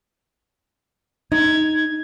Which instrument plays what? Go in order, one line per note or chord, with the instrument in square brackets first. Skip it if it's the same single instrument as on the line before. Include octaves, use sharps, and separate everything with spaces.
[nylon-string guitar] D#4 [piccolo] G#6